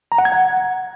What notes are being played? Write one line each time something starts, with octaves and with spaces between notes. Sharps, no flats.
A#5
F#5
G#6
F#5